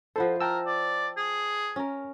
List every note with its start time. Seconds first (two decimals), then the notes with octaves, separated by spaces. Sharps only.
0.16 F3 E4 A4 C5 F#5
0.41 A#4 G5 A5 E6
0.66 D5
1.17 G#4
1.76 C#4 A#4